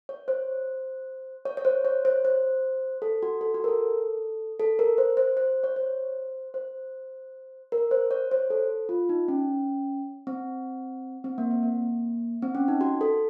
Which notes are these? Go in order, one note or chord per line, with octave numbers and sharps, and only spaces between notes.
C#5
C5
C#5
C#5
C5
C#5
C5
C5
A4
F#4
A4
F#4
A#4
A4
A4
A#4
C5
C5
C5
C#5
C5
C5
A#4
C5
C#5
C5
A4
F4
D#4
C#4
C4
C4
A#3
C4
A#3
C4
C#4
D#4
F#4
A4